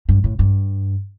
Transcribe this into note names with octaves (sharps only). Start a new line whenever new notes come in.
G2
A2
G2